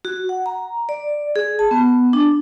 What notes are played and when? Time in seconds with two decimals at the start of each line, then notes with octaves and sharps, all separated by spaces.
0.05 F#4
0.29 F#5
0.46 A#5
0.89 D5
1.36 G#4
1.59 A5
1.71 B3
2.13 D4